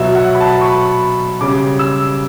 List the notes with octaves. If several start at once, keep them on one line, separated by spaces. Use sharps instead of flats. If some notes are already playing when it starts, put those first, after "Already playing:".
Already playing: B2 F#3 E5
F#5
B5
A5
C#6
B5
C#3 G3 D6
E6